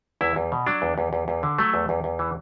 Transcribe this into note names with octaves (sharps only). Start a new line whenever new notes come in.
E2 E4
E2
B2
F#3 D4
E2
E2
E2
E2
D3
F#3 A3
E2
E2
E2
E3